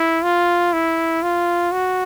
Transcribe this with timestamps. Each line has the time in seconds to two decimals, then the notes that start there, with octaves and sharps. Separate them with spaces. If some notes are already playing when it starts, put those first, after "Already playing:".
Already playing: E4
0.23 F4
0.73 E4
1.23 F4
1.72 F#4